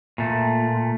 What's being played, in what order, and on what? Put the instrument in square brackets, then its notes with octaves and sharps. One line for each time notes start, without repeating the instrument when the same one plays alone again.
[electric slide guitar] A#2 A3